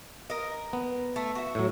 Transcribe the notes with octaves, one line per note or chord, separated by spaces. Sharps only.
A#4 D#5
B3
A3
F#4 E5
A2 F#3